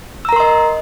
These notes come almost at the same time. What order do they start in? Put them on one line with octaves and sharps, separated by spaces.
E6 A#5 A#4 C6 D#5